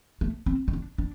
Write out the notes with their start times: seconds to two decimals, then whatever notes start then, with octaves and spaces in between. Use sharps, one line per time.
0.21 A3
0.46 C4
0.68 C4
0.73 D4
0.98 D4